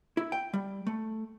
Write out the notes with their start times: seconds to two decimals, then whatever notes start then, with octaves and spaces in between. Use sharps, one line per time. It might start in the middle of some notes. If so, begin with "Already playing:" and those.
0.17 E4
0.32 G5
0.53 G3
0.87 A3